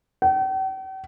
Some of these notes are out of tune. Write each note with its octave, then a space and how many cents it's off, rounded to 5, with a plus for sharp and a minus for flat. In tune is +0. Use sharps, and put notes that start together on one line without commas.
G5 -45